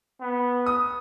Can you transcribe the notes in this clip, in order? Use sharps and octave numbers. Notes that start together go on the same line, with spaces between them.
B3
D#6